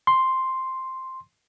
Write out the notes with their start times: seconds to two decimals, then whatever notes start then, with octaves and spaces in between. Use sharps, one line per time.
0.07 C6